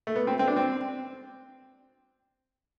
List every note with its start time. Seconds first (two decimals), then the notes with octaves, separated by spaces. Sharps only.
0.07 A3
0.16 B3
0.27 C4
0.39 C4
0.48 D4
0.56 C4